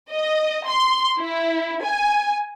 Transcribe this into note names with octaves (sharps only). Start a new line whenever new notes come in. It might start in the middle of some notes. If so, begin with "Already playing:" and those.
D#5
C6
E4
G#5